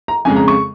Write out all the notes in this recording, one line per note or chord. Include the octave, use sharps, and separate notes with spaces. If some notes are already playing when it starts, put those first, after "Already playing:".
A#5
F2 C#3 G#3 G#5
A#5
C#6